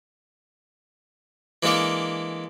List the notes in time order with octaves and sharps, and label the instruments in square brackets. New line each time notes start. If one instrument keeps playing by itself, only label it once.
[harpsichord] E3 G#3 A#3 D4 A4